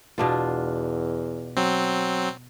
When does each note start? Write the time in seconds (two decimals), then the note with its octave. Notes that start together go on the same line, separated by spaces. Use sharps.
0.18 E2 B2 D4 F4
1.57 F#3 C4